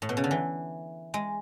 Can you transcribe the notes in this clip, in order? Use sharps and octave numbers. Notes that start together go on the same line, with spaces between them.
A2
B2
C#3
D3
E3
G#3